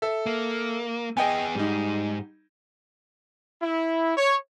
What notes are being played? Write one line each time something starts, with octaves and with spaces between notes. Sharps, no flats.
A4 E5
A#3
B3 G#4 D#5 G5 G#5
G#2 G3 D#4
E4
C#5